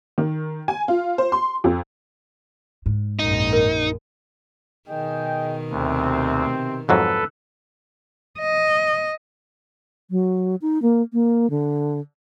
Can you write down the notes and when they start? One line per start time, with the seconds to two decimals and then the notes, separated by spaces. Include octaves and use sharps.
0.18 D#3
0.68 G#5
0.88 F4
1.18 C5
1.32 C6
1.64 F2
2.86 G#2
3.19 A#1 F#2 D#4
3.53 A#4
4.89 B2 D#3 G#4 D#5 G5
5.71 D2 C3 C4
6.89 F2 G#2 F#3 A4 B4
8.40 D#5
10.11 F#3
10.61 D#4
10.82 A#3
11.13 A#3
11.50 D3